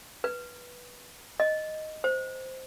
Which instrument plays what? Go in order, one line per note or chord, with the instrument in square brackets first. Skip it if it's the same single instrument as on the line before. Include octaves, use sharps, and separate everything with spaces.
[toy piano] B4
D#5
C5